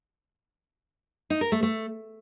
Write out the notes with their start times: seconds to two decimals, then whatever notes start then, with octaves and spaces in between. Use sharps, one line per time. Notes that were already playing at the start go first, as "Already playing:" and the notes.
1.30 D#4
1.41 A#4
1.52 A3
1.63 A3